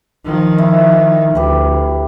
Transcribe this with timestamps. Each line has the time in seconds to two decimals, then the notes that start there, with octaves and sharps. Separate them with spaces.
0.25 D#3 F3
0.58 E4
1.35 D2 G4 B4